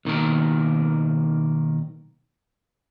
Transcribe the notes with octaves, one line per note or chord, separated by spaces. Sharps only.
B1 D#3 A#3 A#4